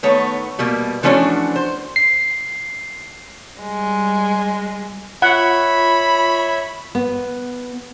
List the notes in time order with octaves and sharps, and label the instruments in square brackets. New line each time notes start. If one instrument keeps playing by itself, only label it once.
[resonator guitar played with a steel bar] D#3 A3 B3 C#5
B2 G3 A#3
E3 F3 A3 C#4 D4 F#4
C5
[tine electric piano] C7
[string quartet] G3 G#3
[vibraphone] F4 [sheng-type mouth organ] C#5 E5 [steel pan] F#5 [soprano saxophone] B5
[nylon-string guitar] B3